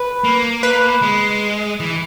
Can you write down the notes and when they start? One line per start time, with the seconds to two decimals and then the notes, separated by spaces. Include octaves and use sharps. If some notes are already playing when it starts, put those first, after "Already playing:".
Already playing: B4
0.24 A#3
0.63 B4
1.02 G#3
1.80 E3